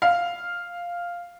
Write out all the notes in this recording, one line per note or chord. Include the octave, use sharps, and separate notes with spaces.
F5